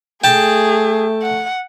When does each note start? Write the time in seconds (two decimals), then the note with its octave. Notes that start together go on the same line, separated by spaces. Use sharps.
0.24 A3 G#4 G5 A5
1.23 F#5